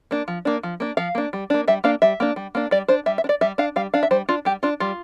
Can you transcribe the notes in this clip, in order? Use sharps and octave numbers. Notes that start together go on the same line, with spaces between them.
A#3 D4
F3
A#3 D4
F3
A#3 D4
F3 F5
A#3 D4
G3
A#3 D4
G3 E5
A#3 D4 F5
G3 E5
A#3 D4
G3
A#3 D4
G3 D5
D4 C5
G3 E5
E5
D4
D5
G3 E5
D4 F5
G3 F5
D4 F5
E5
G3 C5
D4 F4
G3 G4
D4 F4
G3 F4